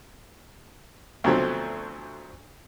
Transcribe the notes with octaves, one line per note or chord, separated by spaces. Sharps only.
D2 B2 F3 F#3 A3 C4